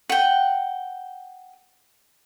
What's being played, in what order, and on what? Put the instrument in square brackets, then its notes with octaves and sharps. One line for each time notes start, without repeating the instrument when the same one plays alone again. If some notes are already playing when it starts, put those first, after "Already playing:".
[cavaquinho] F#5 G5